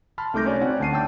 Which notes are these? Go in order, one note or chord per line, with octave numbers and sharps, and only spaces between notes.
A5 B5 C6 F6
C2 A3 D#4 D6 G6 A#6
C#4 F#4 C#5 D5
C4 C#4 D#4 D5 F#5
D2 A5 C7 D#7
G5 A5 D6 E6 G6